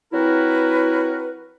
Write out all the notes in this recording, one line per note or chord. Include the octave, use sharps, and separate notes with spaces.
F#3 C4 E4 F#4 A#4 B4